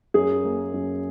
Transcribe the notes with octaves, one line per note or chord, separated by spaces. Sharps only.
F#2 G#4
A#3
F#2